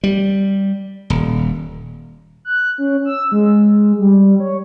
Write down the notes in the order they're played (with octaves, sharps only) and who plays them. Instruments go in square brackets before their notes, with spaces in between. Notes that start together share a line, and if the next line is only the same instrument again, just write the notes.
[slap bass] G3
D#1
[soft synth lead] F#6
C#4
E6
G#3
G3
C#5